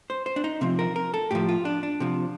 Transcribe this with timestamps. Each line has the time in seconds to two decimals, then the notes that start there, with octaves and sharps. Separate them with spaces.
0.10 C5
0.26 C5
0.36 D4
0.44 D#4
0.61 C3 F3 C4
0.79 A#4
0.96 A#4
1.14 A4
1.31 A2 F3 G4
1.49 F4
1.65 D4
1.83 D4
2.00 C3 F3